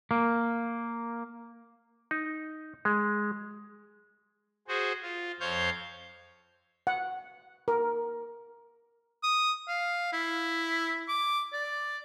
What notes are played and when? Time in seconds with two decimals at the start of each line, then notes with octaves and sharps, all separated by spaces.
0.11 A#3
2.11 D#4
2.85 G#3
4.68 F#4 G#4 C5
5.02 F4
5.40 F2 C5 C#5 F5 G6
6.87 F#5
7.68 A#4
9.23 D#6
9.68 F5
10.13 E4
11.09 D6
11.53 D5